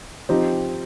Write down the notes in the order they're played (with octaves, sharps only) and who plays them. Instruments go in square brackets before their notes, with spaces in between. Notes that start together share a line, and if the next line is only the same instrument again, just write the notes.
[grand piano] F3 C4 D#4 G4